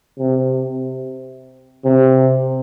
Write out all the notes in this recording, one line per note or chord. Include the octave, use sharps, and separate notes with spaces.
C3
C3